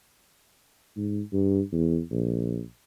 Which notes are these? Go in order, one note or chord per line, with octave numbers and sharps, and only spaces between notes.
G#2
G2
E2
A#1